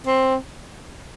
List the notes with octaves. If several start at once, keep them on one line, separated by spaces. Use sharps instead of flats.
C4